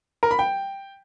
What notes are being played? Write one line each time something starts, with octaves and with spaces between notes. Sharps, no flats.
A#4
B5
G5